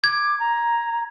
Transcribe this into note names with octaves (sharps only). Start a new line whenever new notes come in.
D6 G#6
A#5